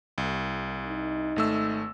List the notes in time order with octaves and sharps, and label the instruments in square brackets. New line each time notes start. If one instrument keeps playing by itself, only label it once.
[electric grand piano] C2
[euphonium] D#4
[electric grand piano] G#1 A3 E6